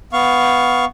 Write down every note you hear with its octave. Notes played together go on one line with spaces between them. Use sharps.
B3 F5 C#6